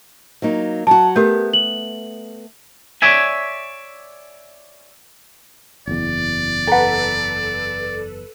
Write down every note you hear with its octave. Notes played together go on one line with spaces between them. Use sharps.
F#3 A#3 D#4
F#3 F#4 A5
A3 B3 G4 A#4 G6
F#7
C#5 D5 E5 G#5
F#1 E2 D5
A4 B4 F#5 A#5